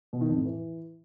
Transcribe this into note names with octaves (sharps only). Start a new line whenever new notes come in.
B2
D#3
F2
A2
E3